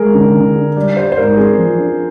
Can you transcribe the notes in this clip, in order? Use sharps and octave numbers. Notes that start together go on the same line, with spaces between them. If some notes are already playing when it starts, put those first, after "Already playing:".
Already playing: G#3 G#4 A#4
D3
D3
D4
G3 D5
G4 C5
C5
G#2 A#4
C4 G#4
F3
D4